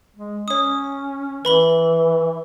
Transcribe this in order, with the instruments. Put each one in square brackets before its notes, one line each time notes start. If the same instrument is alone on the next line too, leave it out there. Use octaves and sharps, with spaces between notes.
[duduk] G#3
[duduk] C#4 [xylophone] C#5 D#6
[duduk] E3 [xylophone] B4 B5 G7